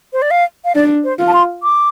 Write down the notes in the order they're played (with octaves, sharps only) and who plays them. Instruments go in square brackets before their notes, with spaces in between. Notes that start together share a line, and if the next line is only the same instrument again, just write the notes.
[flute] C5
D5
F5
F5
[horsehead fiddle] D4 [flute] D5
[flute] C5
[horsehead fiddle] F4
[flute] A5
C6
D6